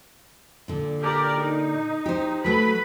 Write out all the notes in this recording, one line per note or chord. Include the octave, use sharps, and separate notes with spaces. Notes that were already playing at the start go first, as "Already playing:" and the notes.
A#2 D3
G4 A#4 D5
D#4
G4 C5
F#3 A3 B4 B5